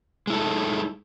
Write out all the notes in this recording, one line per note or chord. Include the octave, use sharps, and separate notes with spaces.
G#3 D#4 E4 A4